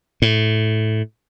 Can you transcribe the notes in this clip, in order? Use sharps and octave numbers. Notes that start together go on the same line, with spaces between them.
A2